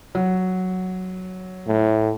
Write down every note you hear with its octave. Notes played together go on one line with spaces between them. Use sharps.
F#3
A2